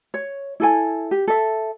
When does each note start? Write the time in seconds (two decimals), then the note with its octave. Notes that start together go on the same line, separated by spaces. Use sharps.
0.14 C#5
0.60 E4 A4 G#5
1.11 G4
1.28 A4 E5